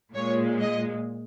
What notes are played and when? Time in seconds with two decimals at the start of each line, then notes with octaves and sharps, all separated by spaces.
0.13 A#2 G#3 C#5
0.61 D#5